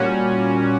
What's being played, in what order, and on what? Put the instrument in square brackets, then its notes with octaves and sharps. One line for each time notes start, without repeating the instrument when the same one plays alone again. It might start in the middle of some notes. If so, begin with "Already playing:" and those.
Already playing: [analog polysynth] A#2 G3 C#4 F#4